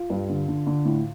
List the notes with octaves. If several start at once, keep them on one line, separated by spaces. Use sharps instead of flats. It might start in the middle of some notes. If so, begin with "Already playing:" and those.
Already playing: F4
G2
D3
D3
D3
A2